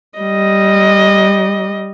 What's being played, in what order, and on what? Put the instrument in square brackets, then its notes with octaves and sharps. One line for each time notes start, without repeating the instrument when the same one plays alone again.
[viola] G3 D#5